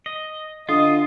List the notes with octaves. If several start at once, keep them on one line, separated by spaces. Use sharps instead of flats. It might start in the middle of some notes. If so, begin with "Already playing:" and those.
D#5
D3 F4 D#5